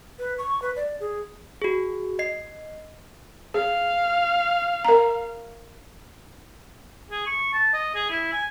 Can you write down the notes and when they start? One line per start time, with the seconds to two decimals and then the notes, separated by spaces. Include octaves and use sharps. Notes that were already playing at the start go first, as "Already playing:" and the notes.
0.19 B4
0.38 C#6
0.62 B4
0.76 D5
1.00 G#4
1.62 F#4 G#4
2.19 D#5 C7
3.54 G#4 F5
4.85 A#4 A#5
7.11 G#4
7.26 C#6
7.53 A5
7.73 D#5
7.95 G#4
8.10 E4
8.33 G#5